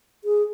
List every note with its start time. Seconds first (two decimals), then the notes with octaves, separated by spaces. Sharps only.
0.24 G#4